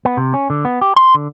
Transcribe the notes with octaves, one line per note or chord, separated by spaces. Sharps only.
B3
C3
C#4
D3
B3
G4
C6
D3